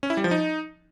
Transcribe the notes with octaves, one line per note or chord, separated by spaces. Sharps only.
C#4
E4
G3
F3
D#4